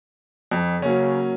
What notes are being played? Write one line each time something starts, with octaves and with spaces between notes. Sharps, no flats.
F2
C#3 F#3 A#3 C#4